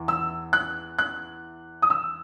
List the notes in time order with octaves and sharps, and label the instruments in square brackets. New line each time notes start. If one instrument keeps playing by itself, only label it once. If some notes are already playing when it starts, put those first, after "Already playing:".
Already playing: [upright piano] E2 E3
E6
F#6
F#6
D#6
E6